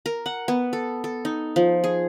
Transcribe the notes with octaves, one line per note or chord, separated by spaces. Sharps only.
A#4
F#5
B3
A4
A4
D#4
F3
G#4